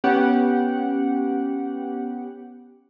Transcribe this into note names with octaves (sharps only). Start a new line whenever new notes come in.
B3 C#4 G4 F#5